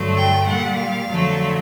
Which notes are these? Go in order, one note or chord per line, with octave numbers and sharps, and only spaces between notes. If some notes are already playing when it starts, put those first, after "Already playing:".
Already playing: G2 D3 F#3 A3
G5
A#2 G3 F#5
F5
F2 D3 F#3 A3